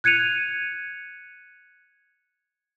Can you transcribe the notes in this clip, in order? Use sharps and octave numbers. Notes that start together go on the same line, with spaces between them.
F#6 G#6 C#7 D#7 F7